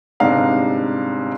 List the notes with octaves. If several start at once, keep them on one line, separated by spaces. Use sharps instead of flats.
G1 G#2 C3 D4 F5 A#5